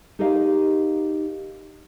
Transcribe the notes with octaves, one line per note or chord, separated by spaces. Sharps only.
D#4 G4 G#4 A#4 D#5 F5